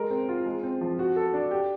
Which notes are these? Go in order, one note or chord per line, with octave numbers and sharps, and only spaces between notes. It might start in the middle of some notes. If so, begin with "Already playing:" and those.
Already playing: G#3 A#4
C4
F4
G#3
C4
F3
F#4
A4
D4
G4